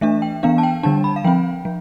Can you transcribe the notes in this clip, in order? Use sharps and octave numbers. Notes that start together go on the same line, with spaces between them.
E3 A3 D4 E5
G5
E3 B3 D4 F5
A5
G5
D3 G3 D4 A5
B5
F5
F3 C4 G5
F3